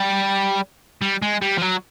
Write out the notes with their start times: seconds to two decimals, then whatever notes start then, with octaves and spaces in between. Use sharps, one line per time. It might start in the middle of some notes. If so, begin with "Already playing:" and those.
Already playing: G3
1.02 G3
1.22 G#3
1.42 G3
1.58 F3
1.61 F#3